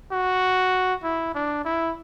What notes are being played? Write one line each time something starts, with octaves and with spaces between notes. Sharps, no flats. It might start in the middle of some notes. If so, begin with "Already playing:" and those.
F#4
E4
D4
E4